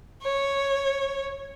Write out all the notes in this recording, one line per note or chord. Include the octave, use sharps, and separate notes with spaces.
C#5